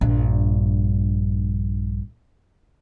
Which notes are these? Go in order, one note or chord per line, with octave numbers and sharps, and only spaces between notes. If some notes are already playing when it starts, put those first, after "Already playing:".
A#1 G2